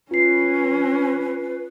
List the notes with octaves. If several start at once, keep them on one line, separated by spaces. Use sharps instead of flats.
C#4 F4 B4 C7